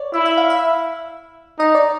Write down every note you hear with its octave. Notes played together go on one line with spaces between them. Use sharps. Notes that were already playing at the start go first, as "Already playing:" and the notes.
Already playing: C#5 D5
E4 E5
E5
F5
E5
D#4 D#5
D5